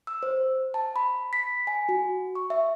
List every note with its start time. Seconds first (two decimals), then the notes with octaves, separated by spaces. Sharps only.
0.07 E6
0.23 C5
0.74 A5
0.96 B5
1.33 B6
1.67 G#5
1.89 F#4
2.35 C#6
2.50 E5